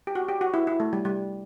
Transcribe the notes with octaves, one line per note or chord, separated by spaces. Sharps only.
G4
F#4
G4
F#4
E4
E4
A3
G3
G3